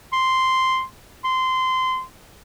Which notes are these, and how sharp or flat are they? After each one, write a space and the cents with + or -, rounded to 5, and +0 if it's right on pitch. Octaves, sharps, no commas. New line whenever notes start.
C6 -5
C6 -20